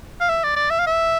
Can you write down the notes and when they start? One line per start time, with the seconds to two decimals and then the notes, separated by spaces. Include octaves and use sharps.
0.20 F5
0.29 E5
0.44 D5
0.56 D5
0.70 E5
0.79 F5
0.87 E5